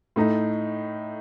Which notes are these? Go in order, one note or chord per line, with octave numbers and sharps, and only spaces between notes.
A2 A3 D#4